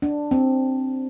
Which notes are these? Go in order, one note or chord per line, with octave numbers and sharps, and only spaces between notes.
D4
C4